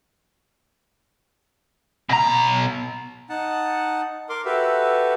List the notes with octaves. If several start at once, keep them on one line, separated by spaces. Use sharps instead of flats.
B2 A#5
D#4 F#5 A5
A#4 C6 D6
F#4 G4 A4 B4 E5